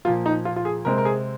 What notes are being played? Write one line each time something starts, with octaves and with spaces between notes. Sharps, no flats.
A#2 F3 A#3 F4
D#4
F4
F4
G#4
C3 G#3 C4 A#4
A#4
G#4